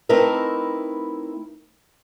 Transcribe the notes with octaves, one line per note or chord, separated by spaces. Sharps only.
A3 C4 D#4 E4 A#4 B4